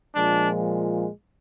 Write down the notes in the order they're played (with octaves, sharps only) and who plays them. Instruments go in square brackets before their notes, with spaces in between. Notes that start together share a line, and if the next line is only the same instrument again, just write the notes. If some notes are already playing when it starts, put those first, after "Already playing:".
[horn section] A#2 F3 G#3 D4